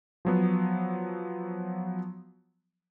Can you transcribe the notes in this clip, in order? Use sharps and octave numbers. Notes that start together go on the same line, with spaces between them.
F3 F#3 B3